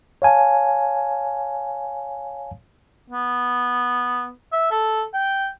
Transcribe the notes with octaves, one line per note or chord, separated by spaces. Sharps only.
C#5 F5 G#5 A5
B3
E5
A4
G5